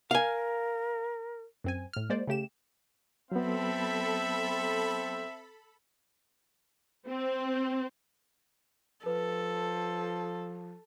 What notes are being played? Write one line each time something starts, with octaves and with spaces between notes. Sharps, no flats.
A#4 F5 G#5
F#2 C4 G#5
A2 F6
G#3 A#3 C5 D5
C#3 A3 G4 E7
F#3 B3 C4 A4 E5 B5
C4
F3 A4 B4